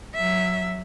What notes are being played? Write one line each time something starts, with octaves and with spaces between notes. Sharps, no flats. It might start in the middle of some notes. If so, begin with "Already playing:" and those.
F#3 E5